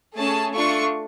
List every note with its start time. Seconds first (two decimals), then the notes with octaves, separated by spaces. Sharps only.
0.17 A3 C#4 G#4 A5
0.53 A3 D4 F4 C#6